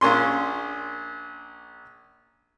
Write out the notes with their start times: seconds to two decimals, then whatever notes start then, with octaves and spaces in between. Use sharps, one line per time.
0.01 A#1 A#3 C#4 C6